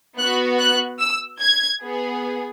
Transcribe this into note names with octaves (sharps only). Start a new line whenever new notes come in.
B3 F#4 F#6
F#6
E6
G#6
B3 G#4